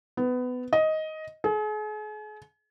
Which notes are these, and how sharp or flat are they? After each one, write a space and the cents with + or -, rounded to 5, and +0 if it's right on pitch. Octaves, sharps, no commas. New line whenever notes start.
B3 +20
D#5 +10
G#4 +40